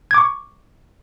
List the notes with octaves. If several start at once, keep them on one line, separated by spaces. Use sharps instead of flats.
C#6 D6 G#6